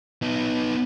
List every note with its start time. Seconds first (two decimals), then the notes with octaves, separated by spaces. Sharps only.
0.22 B3 D#4